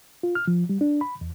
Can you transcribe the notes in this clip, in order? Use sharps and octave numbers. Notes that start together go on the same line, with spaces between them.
F4
F6
F3
G3
D4
B5
E2